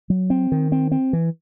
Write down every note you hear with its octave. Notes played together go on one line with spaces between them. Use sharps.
F#3
C4
D#3
C4
C4
E3